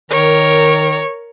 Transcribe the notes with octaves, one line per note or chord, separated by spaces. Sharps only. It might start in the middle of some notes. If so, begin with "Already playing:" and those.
D#3 A#4 C#5